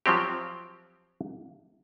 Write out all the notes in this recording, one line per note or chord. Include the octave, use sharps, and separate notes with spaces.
F3 F#3 C4 G4